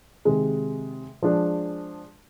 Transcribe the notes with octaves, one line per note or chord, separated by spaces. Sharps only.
C3 D#3 G#3
F3 G#3 D4